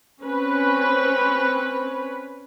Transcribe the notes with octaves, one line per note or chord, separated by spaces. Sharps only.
C4 C#4 B4